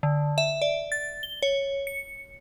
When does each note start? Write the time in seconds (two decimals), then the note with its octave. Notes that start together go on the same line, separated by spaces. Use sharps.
0.03 D3
0.38 E5
0.62 D5
0.92 A6
1.23 G7
1.43 C#5
1.87 C#7